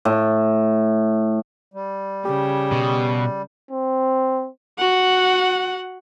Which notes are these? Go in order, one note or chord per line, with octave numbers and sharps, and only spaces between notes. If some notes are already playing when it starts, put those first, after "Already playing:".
A2
G3
C#3 G4
B2
C4
F#4 F#5